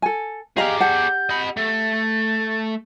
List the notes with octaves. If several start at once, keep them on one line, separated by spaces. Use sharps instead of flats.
A4 G#5
G4 G#4 D5 D#5 F5 A#5
G4 F#5 A5 G6
D#5 B5
A3 A6